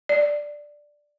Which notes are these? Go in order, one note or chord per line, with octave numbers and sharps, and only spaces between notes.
D5